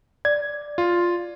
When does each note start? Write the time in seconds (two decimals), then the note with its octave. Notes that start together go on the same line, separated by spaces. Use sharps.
0.25 D5 G#6
0.78 F4